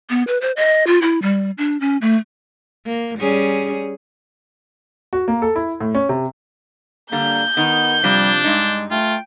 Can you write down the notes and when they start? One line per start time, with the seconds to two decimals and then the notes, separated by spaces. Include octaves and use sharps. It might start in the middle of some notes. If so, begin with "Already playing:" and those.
0.10 B3
0.27 B4
0.41 C5
0.57 D#5
0.87 F4
1.02 E4
1.22 G3
1.58 D4
1.81 C#4
2.02 A3
2.85 A#3
3.19 G3 C#4 G#4
5.13 F#4
5.28 A#3
5.42 A4
5.56 E4
5.81 A2
5.95 C#4
6.09 C3
7.12 D3 G3 A#3 G6
7.57 D#3 B3 D#4
8.04 C3 F3 G3 D4
8.44 G2 G#3 D#4
8.91 A3 F4 G5